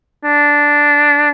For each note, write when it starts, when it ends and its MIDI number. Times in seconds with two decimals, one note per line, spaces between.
0.25 1.30 62